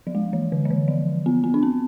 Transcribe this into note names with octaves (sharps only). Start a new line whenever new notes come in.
F3
G#3
E3
D3
E3
D3
F3
B3
B3
D4
C4